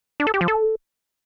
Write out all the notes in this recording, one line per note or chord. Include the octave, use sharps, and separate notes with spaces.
D4
A4
G4
F3
A4